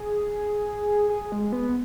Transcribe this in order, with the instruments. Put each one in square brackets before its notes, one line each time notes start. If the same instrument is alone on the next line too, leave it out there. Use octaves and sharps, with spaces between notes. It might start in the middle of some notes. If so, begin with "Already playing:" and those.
Already playing: [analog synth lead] G#4
G#4
G#3
B3